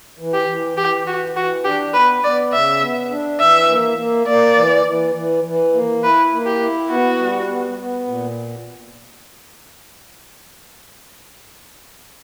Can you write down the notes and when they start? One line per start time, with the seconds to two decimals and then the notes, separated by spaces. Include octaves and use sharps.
0.19 E3
0.34 G4
0.48 E3
0.78 E3 G4
1.07 E3 F#4
1.36 E3 F#4
1.64 D4 G4
1.94 B3 B4
2.23 B3 D5
2.53 C#3 E5
2.81 B3
3.10 D4
3.40 E3 E5
3.69 A#3
3.98 A#3
4.27 A#3 D5
4.56 E3
4.86 E3
5.14 E3
5.44 E3
5.74 A#3
6.03 E4 B4
6.32 A#3
6.46 G4
6.60 E4
6.90 B3 F#4
7.19 G3
7.48 B3
7.78 B3
8.07 A#2